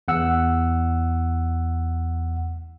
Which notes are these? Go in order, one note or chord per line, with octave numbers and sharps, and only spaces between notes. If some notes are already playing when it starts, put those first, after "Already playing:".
E2 F#5 E6